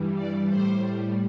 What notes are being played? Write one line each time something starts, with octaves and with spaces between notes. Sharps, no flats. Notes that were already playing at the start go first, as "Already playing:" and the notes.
Already playing: G2 E3 G3
D5
A2 G3 C5